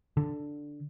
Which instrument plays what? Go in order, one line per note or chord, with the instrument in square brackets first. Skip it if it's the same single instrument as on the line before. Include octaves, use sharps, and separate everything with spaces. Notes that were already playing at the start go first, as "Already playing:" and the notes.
[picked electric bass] D3